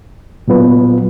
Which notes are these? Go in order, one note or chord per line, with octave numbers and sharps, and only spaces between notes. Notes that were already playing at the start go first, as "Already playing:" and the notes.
A#2 F#3 B3 F4 B4